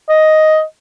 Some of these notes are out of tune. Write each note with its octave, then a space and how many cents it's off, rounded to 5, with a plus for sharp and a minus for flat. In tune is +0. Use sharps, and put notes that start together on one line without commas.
D#5 +5